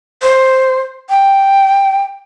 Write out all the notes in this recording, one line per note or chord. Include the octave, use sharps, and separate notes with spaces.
C5
G5